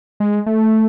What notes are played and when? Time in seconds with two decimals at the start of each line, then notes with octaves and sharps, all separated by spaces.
0.20 G#3
0.46 A3